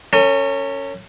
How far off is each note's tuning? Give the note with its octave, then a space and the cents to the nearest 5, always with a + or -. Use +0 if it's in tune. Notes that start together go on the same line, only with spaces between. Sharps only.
C#4 +0 A#4 -45